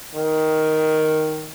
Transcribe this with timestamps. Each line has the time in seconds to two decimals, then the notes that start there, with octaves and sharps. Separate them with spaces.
0.15 D#3